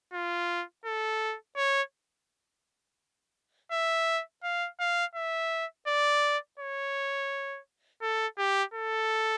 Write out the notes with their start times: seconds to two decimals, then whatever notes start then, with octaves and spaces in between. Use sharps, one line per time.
0.13 F4
0.86 A4
1.57 C#5
3.72 E5
4.43 F5
4.80 F5
5.16 E5
5.87 D5
6.59 C#5
8.02 A4
8.38 G4
8.74 A4